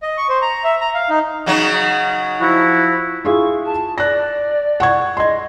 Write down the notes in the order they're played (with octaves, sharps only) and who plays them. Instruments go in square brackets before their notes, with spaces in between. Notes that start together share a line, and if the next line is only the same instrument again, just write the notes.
[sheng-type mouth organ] D#5
C#6
C5
A#5
E5
A#5
F5
D#4
[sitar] C#3 F#3 D#4
[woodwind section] F3 E4 F#4
[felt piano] E4 F4 G#4 [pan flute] C#6
[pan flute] A5
[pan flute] D5 [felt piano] F#6 A#6
[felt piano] F#5 C#6 G#6
[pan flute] D#5 [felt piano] C6 G#6